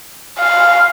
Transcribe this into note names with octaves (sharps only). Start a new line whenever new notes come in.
F5